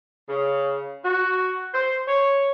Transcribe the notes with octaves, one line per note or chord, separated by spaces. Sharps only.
C#3
F#4
C5
C#5